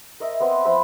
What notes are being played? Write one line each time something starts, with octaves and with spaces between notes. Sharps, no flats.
A#4 D#5 E5
B3 C4 B4
F3 C5 E5 B5